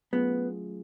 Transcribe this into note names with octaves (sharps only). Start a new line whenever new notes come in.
F#3 A3 B3 C#4 F4 G#4